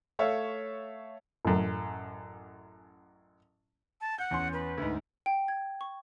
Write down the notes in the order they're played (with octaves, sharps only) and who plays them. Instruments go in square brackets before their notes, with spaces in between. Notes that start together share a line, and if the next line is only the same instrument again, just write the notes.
[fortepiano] A3 C#5 E5 F5
A1 F#2
[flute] A5
[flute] F#5 [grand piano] G6
[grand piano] E2 C#4 C6
[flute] B4
[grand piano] D2 G#2
[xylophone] G5
G#6
C#6